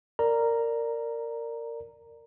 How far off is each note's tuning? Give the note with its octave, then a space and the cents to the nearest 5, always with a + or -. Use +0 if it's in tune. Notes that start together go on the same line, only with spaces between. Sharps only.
A#4 -15 D5 +0 A#5 +0